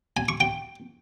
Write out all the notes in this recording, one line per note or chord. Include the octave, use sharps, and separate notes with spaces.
G#5
C#6
G5